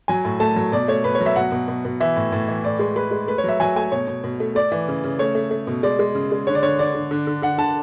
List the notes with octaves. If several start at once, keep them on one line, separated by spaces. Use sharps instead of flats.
F#3 G#5
A2
A3 A5
F#3
B2 D5
A3 C#5
B2 B4
C#5
F#3
E5
B2 F#5
B2
B2
B2
E3 E5
A2
A2
E3
A2 D5
G#3
G#3 B4
G#3
A3 B4
C#5
F#3 E5
F#3 G#5
A3 G#5
B2 C#5
B2
B2
A3
A3 D5
E3
C#3
C#3
A3 C#5
A3
A3
B2
G#3 D5
G#3
C#3
G#3
D3 C#5
D5
D3 C#5
D3 D5
D3
D3
D3
D3 F#5
D3 A5